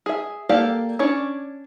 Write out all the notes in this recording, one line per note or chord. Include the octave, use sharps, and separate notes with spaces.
G#4 E5
A#3 G4 A4 D5 F5
C#4 D4 C#5 D5